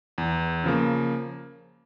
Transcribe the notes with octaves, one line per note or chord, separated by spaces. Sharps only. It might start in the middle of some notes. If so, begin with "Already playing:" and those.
E2
C#3 F3 A#3